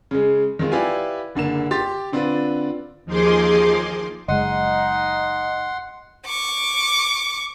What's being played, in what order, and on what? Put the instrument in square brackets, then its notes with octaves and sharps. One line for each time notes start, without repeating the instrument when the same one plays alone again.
[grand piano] C#3 G#3
D#3 G#3 C4 F4
E4 G4 B4 D5 F5 G#5
F#1 D3 A#3 E7
G4 C6 A6
D3 C4 D4 F4 B4
[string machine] D#2 F3 D#4 G#4 C6 D6
[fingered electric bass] F#1 G#3 [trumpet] D#4 [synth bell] D#5 [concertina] F#5 C6
[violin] C#6 D6